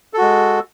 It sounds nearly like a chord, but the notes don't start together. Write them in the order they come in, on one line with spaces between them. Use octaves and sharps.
A4 F#4 G#3